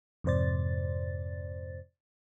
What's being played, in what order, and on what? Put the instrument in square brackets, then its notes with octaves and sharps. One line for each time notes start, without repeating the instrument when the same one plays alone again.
[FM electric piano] F2 G#2 C3 C5 D5 A6